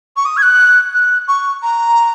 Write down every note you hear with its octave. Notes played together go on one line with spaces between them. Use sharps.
C#6
D#6
G#6
F#6
F#6
C#6
A#5